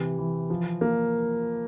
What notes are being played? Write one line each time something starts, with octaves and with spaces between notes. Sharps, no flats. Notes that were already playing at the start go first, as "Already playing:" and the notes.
Already playing: C3 E3
E3
F3
A#3